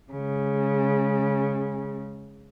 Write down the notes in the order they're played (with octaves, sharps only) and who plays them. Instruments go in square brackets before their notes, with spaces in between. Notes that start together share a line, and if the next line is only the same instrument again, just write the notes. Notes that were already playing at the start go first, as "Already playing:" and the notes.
[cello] C#3 G#3